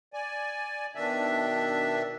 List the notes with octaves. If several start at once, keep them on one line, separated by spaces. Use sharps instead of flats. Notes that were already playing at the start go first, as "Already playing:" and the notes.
D5 G#5
B2 D#3 D4 E5